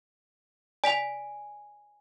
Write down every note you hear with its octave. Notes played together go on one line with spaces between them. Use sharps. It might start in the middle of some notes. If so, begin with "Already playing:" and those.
D5 G#5 B6 F7